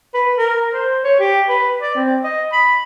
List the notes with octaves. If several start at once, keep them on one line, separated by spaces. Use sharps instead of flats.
B4
A#4
C5
C#5
G4
B4
D5
C4
D#5
B5